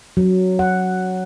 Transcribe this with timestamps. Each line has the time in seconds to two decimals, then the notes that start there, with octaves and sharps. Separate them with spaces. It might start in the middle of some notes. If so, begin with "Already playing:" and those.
0.17 F#3
0.59 F#5